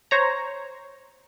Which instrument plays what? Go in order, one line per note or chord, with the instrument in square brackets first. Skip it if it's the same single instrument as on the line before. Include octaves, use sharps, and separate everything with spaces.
[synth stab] C5 C#5 A#5